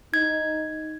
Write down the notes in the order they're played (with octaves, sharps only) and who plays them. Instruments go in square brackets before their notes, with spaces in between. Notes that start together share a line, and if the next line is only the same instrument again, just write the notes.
[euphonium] D#4 [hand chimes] G#6